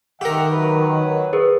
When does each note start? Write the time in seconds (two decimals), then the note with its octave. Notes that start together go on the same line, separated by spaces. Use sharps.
0.21 D#3 G4 A#4 E5 F#5 G5 D6
0.50 F#3 B4
1.33 G#4 A#4 B4